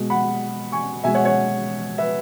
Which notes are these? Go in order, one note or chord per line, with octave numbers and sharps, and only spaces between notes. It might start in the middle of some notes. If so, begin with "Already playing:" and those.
Already playing: B2 G#3
F#5 B5
G#5 C#6
B2 G#3 E5 G#5
C#5 F#5
C#5 F#5
B4 E5